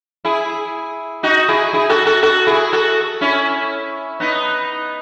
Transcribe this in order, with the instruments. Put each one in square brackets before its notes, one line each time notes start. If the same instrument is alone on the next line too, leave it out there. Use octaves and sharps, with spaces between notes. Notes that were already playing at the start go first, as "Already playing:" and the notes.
[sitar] E4 G#4
D#4 F#4
E4 G#4
E4 G#4
F#4 A4
F#4 A4
F#4 A4
E4 G#4
F#4 A4
C#4 E4
B3 D#4